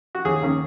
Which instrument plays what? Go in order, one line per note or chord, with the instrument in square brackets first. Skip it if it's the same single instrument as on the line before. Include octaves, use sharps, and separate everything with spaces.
[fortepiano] F#4
D#2 G#4
D#3 A#3 C#4